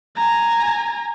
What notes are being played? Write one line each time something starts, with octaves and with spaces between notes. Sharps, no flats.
G#5 A#5